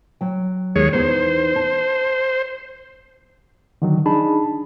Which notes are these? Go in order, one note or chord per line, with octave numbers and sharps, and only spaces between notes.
F#3 G5
D#2 G#3 C#5
E2 B3 D#4 C5
A5
D3 D#3 F#3
D4 D#4 G#4 A5 B5